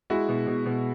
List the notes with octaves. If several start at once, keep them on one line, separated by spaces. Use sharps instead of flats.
G#3 E4 F#4
B2
B2
B2